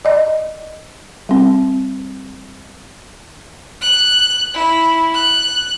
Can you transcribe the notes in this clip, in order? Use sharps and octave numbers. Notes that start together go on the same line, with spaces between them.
D5 D#5
G3 C4
F#6
E4
F#6